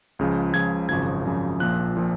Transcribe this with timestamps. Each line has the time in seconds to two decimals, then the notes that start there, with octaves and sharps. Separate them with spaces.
0.19 C#2 C#3 F3
0.54 C#2 C#3 F3 G#6
0.89 G#1 F#2 C#3 F3 G#6
1.25 G#1 F#2 C#3 F3
1.60 A#1 A#2 F3 F#6
1.97 A#2 F3